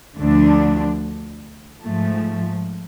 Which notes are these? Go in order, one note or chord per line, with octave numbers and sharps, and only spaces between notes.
D2 D3 F3 A3 D4
G#2 F3 A3